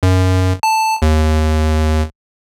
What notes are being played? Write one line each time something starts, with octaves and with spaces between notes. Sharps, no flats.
F#2
A5
D#2